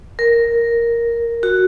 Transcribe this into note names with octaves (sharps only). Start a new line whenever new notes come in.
A#4
F#4